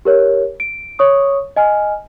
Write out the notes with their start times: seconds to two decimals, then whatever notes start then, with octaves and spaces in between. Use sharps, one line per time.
0.05 G4 A#4 C#5
0.60 D7
0.99 C#5 C#6 D#6
1.56 D#5 G#5 F6